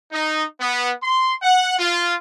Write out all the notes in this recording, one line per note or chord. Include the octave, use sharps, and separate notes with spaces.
D#4
B3
C6
F#5
F4